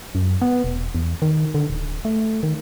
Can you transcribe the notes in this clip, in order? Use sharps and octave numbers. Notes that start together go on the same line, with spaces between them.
F#2
B3
E1
E2
D#3
D3
D1
A3
D#3